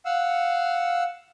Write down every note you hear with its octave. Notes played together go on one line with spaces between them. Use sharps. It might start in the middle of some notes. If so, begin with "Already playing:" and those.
F5 F#5 E6